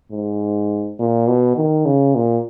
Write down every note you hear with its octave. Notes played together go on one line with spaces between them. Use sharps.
G#2
A#2
B2
D#3
C#3
A#2